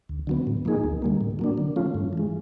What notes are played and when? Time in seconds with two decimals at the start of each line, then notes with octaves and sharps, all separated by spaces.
0.09 D2
0.27 D3 F#3 B3
0.47 A2
0.65 F3 A#3 D#4 G#4
0.84 D2
1.02 D3 G3 A#3
1.21 A2
1.39 F#3 A#3 D4
1.58 D3
1.76 F3 A3 C#4 F4
1.94 G2
2.13 E3 G#3